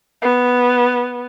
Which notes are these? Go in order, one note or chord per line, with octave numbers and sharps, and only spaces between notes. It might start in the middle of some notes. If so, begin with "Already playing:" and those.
B3